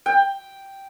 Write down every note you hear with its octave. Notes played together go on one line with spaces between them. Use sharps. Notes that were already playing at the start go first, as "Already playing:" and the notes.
G5